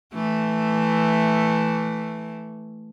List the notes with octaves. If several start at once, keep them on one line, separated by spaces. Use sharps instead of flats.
E3 A3